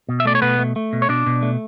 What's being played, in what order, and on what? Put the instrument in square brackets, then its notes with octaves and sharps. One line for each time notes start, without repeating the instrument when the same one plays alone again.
[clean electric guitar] B2
E5
A3 D5
C#5
B2 B3 B4
A3
A3
B2
C#5
B2 D4 D5
B2
A3